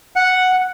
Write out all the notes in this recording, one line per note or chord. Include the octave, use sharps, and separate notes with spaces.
F#5